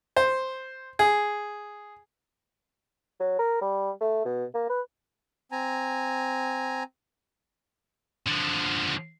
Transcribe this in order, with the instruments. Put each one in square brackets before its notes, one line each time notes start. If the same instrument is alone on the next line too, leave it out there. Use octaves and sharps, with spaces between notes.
[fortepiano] C5
G#4
[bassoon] F#3
A#4
G3
A3
B2
A#3
B4
[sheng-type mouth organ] C4 G#5 A#5
[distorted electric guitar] D3 F3